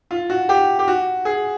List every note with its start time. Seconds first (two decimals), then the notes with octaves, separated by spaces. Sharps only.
0.11 F4
0.30 F#4
0.49 G4
0.79 G4
0.88 F#4
1.25 G#4